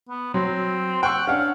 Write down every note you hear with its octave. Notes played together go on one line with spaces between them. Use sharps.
B3
F#3 C4
F#5 G5 C#6 E6
C#4 D4 F5 F#5